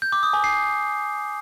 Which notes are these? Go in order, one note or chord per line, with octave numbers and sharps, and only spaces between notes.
G6
D6
D#6
G#5
C7